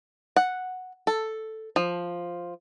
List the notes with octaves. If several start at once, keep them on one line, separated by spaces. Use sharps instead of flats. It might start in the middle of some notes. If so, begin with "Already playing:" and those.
F#5
A4
F3